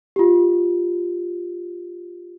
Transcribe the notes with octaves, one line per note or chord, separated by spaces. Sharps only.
F4 G4